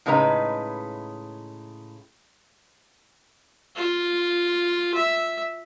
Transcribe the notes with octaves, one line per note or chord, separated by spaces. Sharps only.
A2 C#3 G#3 D#4 B4 A#5
F4
E5